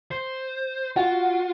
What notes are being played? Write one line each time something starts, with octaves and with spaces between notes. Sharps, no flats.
C5
F4 F#4